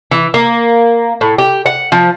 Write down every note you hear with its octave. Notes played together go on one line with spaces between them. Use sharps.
E3
A#3
A2
G4
F#5
F3